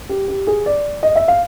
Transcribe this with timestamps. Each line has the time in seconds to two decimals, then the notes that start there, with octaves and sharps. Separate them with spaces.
0.09 G4
0.28 G4
0.47 G#4
0.66 D5
1.03 D#5
1.15 E5
1.28 F5